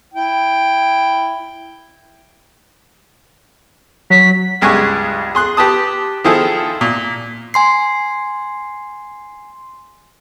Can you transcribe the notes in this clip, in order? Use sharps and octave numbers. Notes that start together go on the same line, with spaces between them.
E4 G5
F#3 B6
C#2 G2 G#3 G#5 C#6
G#4 C6 F#6
G4 B4 A5 D#6
D#3 F3 E4 G#4 A4 C5
A#2
G#5 C6 C7